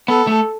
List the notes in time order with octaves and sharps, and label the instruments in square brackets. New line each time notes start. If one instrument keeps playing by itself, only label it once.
[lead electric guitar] B3 [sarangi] A4
[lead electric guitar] A3